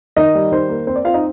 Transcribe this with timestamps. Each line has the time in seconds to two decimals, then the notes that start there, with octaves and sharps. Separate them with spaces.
0.17 D#3 D#4 D#5
0.35 G3
0.52 D#3 C5
0.69 A#3
0.87 C4 C5
0.96 D5
1.05 C4 F4 F5
1.14 D#4 D#5